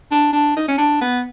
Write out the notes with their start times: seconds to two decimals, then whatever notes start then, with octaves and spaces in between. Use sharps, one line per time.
0.11 D4
0.33 D4
0.56 D#4
0.68 C#4
0.78 D4
1.01 B3